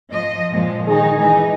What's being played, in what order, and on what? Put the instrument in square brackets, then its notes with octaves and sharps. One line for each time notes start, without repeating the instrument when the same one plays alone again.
[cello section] F3 D#5
A#2 F3 G#3
[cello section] D#3 D#4 [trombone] G#4
[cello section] E3 G#3 D#4